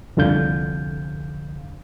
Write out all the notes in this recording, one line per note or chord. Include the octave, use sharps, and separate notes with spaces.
C2 F2 D3 F5 G6